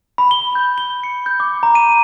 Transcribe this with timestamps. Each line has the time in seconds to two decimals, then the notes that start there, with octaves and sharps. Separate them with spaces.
0.18 B5
0.31 G7
0.55 G6
0.78 G7
1.03 C#7
1.26 G6
1.40 D6
1.63 A#5
1.75 D#7